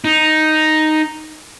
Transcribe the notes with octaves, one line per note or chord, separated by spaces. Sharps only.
D#4